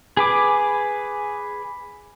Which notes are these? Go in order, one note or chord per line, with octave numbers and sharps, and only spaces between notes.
G#4 B4 D6